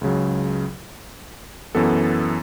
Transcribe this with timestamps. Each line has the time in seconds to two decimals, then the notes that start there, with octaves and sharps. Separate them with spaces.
0.01 C#2 C#3 F#3
1.75 F#2 E3 B3 A4